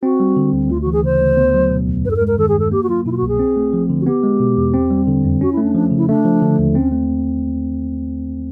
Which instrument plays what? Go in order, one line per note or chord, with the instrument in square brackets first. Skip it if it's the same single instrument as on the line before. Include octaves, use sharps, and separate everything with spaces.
[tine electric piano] C4 [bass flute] F#4
[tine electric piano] G3
D3
D2
[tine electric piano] D2 [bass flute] F4
[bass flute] F#4
[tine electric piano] E3
[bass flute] G#4
[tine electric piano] C#3 [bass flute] C5
[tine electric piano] D2
B3
F#3
B2
E2
[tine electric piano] G2 [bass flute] B4
[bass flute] A4
A#4
[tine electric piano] G#3
[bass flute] A#4
[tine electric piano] D#3 [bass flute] A4
[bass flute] G#4
[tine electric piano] G2 [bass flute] A4
[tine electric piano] A#3 [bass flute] G4
[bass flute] F#4
[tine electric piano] F#3 [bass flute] F4
[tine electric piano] B2 [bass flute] E4
[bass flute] F4
F#4
[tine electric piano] C2
[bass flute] G#4
[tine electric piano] C4
A3
F3
D3
[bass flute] F#4
[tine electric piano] B3 [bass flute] G4
[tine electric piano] G#3
B2
E2
C4
G3
D3
F2
[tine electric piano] C#4 [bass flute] F#4
[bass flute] E4
[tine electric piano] A3
[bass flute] D4
[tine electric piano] F3 [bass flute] D4
[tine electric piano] C#3
[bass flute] E4
[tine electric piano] A3 [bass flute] D4
[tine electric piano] F3
D3
D#2
[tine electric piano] C4 [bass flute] C#4
[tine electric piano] A3